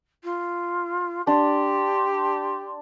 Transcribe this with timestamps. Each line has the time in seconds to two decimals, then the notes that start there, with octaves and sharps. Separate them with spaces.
0.24 F4
1.27 D4 G4 C6